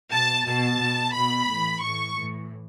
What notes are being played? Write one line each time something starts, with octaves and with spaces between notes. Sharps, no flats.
B2 A5
B2 A5
B2
B2 B5
A2 E3
A2 E3 C#6
A2 E3